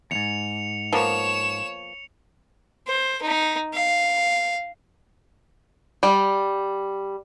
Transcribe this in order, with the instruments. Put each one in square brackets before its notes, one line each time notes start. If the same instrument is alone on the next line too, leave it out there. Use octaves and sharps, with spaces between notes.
[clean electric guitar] E2 G#2 [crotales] C#7 F7
[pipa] F3 A#3 B3 [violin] C#5 E7
[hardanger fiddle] C5
D#4
F5
[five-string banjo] G3